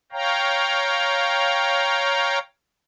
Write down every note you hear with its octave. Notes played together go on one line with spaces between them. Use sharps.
C#5 F5 G5 A#5